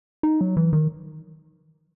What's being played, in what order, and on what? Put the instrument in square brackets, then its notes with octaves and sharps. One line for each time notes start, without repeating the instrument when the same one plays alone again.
[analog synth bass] D#4
F#3
E3
D#3